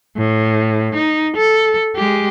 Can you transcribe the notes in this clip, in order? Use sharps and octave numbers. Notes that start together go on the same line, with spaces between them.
A2
D#4
A4
G#3 G4